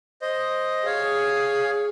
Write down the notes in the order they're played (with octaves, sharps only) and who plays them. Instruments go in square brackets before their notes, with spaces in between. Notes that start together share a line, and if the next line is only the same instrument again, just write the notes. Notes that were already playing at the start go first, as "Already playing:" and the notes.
[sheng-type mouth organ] C5 D#5
[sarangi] G#4 [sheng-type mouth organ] C#5 F5